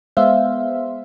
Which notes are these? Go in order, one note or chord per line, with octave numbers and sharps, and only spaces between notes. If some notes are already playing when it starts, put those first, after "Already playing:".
G#3 B3 C5 E5 F5